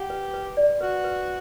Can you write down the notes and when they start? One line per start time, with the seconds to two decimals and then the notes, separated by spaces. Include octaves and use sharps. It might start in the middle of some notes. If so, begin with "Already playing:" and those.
Already playing: G4 F#5
0.10 B4
0.34 B4
0.57 D5
0.80 F#4 B4
1.04 B4